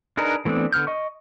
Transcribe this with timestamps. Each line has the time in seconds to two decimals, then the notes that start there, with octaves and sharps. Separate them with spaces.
0.17 D4 D#4 G#4 A#4 B4
0.45 E3 A3 B3 C4 D4
0.73 D3 B3 F6 G6
0.87 D#5 C#6